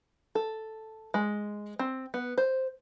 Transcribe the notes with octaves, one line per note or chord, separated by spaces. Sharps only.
A4
G#3
C4
B3
C5